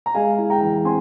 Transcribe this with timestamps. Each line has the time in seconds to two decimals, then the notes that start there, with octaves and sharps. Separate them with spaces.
0.06 A#5
0.14 G#3 F5 G#5
0.38 E4
0.50 G5 A#5
0.62 E3
0.85 C4 G#5 C6